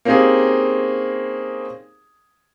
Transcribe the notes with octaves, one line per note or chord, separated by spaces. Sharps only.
A#3 C4 C#4 D#4 G4 G#4